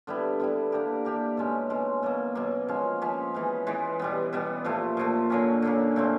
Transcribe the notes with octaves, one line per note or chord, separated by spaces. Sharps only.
D3 G3 B3 E4
D3 G3 B3 E4
A#3 D4 G4 A#4
A#3 D4 G4 A#4
B2 G#3 C#4
B2 G#3 C#4
B2 F#3 A#3
B2 F#3 A#3
F3 G#3 C#4
F3 G#3 C#4
E3 G#3 B3
E3 G#3 B3
B2 G3 B3
B2 G3 B3
A#2 F3 A3
A#2 F3 A3
D3 F#3 A#3 C#4
D3 F#3 A#3 C#4
A#2 F#3 A3 C4